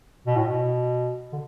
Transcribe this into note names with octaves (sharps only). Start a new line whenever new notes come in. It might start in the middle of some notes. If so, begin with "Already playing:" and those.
B2
A2
B2
D3